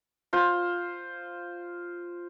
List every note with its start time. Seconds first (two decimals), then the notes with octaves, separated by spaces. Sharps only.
0.33 F4 C5